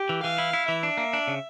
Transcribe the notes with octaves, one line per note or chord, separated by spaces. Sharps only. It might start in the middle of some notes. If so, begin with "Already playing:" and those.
Already playing: G4
E3
E3 F5
E4
E4
E3 E5
D4
A#3
D4
C#3